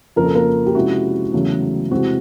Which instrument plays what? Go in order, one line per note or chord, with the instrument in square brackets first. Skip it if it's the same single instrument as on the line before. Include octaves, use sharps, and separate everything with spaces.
[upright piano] F2 C#3 F3 A#3 A#4
A4
A#3 A#4
G4
C3 F3 G#3 C#4 E4 F#4
E2 C#3 F#3 A3
E2 C3 E3 G#3 C4 F#4